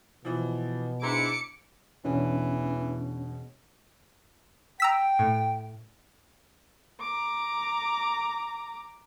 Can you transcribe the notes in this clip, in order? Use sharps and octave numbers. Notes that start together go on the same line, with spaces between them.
B2 E3 F3
G#2 D4 E4 A#5 C6 D6 C#7
E1 B2 E3 C#4 D4
G5 A#5 E6 B6
A2
A#5 D6